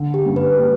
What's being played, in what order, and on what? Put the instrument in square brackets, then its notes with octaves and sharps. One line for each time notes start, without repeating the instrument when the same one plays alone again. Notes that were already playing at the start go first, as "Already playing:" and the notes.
Already playing: [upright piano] D3
[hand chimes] G4
[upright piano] G2
[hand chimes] B4
[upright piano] G3